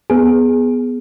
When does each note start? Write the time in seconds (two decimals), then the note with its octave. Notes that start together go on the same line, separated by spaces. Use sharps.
0.10 B3 G#4